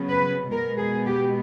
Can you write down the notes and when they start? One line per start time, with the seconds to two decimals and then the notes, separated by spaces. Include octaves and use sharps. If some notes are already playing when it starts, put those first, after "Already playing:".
Already playing: C#3 F#3 B3
0.09 B4
0.51 B2 G#3 B3 A#4
0.79 G#4
1.07 G4